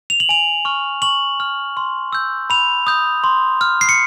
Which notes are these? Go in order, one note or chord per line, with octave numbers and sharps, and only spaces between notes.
F7
F#7
G#5 F7
C#6 F6
C#6 F#7
F6
C6
E6 G6
B5 F7
D#6 G6
C6
F6
C7
C#7